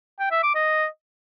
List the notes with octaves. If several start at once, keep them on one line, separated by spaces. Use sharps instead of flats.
G5
E5
D6
D#5